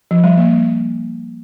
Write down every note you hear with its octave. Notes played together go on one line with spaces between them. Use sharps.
F3
G3
A#3